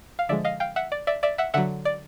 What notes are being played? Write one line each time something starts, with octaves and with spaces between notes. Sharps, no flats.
F5
D3 F3 G#3 D5 E5
D#5 F5
F5 G5
E5 F#5
D5
D5 E5
D5 E5
E5 F#5
D3 F#3 E5 F#5
D5